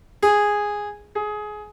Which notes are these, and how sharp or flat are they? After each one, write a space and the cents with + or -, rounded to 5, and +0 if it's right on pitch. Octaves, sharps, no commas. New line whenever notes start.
G#4 -5
G#4 +20